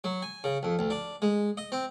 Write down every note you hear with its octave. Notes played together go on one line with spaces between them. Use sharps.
F#3
G#5
C#3
F2
D2
D4
G#3
D#5
C4